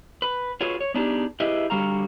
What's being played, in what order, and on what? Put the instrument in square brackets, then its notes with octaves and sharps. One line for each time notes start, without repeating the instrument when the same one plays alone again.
[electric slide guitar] B4
F4 F#4 G#4 B4 C#5
C#5
B3 D4 D#4 G4 G#4
E4 G4 G#4 B4 D#5 E5
D3 G3 F#4 F5 A#5